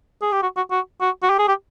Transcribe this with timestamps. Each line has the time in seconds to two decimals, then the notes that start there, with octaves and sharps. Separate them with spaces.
0.22 G#4
0.32 G4
0.43 F#4
0.57 F#4
0.71 F#4
1.01 F#4
1.23 F#4
1.30 G4
1.39 G#4
1.48 G4